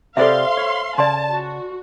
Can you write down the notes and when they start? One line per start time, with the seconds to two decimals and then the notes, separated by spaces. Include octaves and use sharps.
0.17 C3 G4 A4 C5 D5 E5 F5 C6
0.57 C#5
0.98 C#3 D5 G#5 A5 C6
1.32 F#4